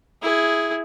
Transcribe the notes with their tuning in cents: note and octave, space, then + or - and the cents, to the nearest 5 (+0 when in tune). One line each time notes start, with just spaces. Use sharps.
E4 +0 G#4 +0